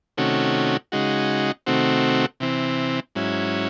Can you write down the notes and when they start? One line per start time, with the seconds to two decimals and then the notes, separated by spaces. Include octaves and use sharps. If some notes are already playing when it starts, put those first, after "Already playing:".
0.17 C3 D#3 A3 C#4 F#4
0.92 C#3 G#3 D#4 F#4
1.67 C3 D#3 A3 C4 F#4
2.40 C3 E3 C4
3.15 G#2 F#3 C#4 E4